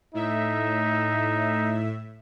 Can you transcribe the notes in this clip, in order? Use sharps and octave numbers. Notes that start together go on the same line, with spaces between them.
A2 D#4 E5